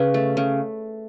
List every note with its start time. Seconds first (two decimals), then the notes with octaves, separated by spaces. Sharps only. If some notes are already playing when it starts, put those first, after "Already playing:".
Already playing: C#3 B4
0.14 A3
0.37 C#3